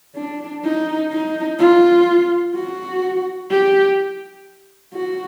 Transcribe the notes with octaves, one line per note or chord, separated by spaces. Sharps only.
D4
D#4
D#4
F4
F#4
G4
F#4